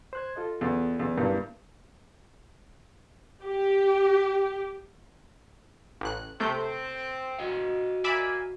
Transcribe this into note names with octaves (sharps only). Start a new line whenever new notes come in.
C5 F#6 G#6
F4 A4 D#5
E2
E2
G2 A#3 E4
G4
A1 F#6
C3 A3 C4 G6
F#4 D#5 F5
A#3 D5 E5 G#5 B5